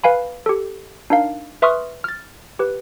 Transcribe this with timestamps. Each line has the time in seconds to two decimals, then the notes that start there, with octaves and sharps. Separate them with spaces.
0.04 B4 F5 G#5 B5
0.46 G4 A4
1.10 D4 D#4 A#4 F5
1.62 B4 E5 C6 C#6 D#6 F6
2.04 F6 A6
2.59 G4 B4